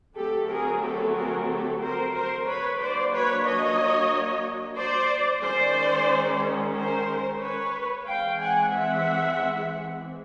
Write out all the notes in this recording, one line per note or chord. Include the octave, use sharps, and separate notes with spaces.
D3 F#3 A3 C4 G4 A4
G#4 A#4
G4 A4
G#4 A#4
G4 A4
A#4 C5
A#4 C5
B4 C#5
F#3 A#3 D4 C5 D5
B4 C#5
C#5 D#5
C5 D5
D#3 G#3 C#4 C5 D5
A#4 C5
B4 C#5
E3 G#3 C4 F5 G5
F#5 G#5
E5 F#5